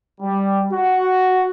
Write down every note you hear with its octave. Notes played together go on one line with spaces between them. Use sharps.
G3
F#4